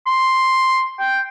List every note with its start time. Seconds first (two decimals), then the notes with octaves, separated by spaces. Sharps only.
0.07 C6
0.99 G5